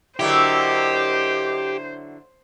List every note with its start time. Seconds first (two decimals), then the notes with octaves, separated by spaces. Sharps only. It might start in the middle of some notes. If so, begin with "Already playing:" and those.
0.19 D3 F#3 E4 G4 A#4 C5 D#5 D6